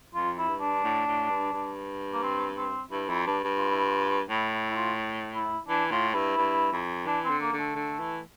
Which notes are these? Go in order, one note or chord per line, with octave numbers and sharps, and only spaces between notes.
F2 F4
E4
G2
D4
A2
A2
G2
G2
A#3
C4
C4
G2 E4
F2 E4
G2 D4
G2
F4
E4
F4
A2 E4
E4
E4
F4
E4
E3 D4
A2 F4
G2 E4
G2
F2
E3 D4
C4
D3
A#3
D3
A3
D3
E3